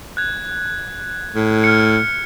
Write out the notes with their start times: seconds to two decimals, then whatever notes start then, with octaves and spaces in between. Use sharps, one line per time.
0.17 F#6 G#6
1.35 A2
1.64 F6 C#7